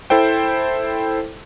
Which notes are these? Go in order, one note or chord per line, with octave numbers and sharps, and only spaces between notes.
E4 A4 C5 G5